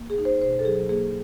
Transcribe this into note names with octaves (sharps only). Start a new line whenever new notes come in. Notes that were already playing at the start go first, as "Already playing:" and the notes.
Already playing: A#3
G#4
D#4
C5
B2 C5
A4
F#3 G#4
A#3 G#4